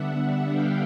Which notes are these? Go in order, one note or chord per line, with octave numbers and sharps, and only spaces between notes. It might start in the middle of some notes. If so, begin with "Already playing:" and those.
Already playing: D3 G3 B3 D4 E5 F#5
F5 G5